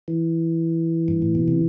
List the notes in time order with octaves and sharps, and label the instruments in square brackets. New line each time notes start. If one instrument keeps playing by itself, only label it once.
[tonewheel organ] E3
G2
A2
B2
C3